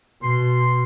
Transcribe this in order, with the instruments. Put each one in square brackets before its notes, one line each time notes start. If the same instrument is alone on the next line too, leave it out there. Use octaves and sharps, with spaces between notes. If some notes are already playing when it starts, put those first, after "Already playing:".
[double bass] B2 [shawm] C6